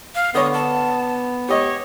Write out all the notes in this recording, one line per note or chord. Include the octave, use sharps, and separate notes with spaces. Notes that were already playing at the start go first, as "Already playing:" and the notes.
F5
D3 B3 C#5 D#6
A5
G4 C#5 D#5